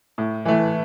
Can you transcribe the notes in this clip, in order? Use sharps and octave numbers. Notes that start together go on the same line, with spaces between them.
A2
E3 A3